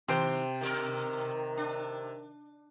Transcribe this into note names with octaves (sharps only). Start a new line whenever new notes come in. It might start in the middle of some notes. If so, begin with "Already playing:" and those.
C3 D#3 C5 G5 C6
B2 D#3 G4 A#4
D4